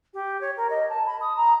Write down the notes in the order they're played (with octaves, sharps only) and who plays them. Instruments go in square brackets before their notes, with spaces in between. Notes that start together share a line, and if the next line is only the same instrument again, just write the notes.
[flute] G4
C#5
A#4
D#5
A5
B5
D#6
A#5